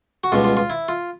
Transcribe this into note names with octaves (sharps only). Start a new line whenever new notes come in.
F#4
C#2 B2 G3 F4
F4
F4
E4
F4